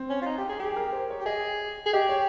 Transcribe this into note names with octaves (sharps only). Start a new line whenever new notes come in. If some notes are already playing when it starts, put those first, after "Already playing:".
Already playing: C4
C#4
F4
D#4
G4
G#4
G4 G#4
G#4
A#4
C5
C#5
G4
G#4 D#5
G#4
G4 D#5
C#5